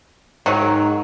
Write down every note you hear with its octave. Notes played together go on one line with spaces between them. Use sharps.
G#2 D#3 F#3